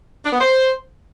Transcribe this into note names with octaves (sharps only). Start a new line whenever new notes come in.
D4
B3
C5